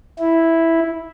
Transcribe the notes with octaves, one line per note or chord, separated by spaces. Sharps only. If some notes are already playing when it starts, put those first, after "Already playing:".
E4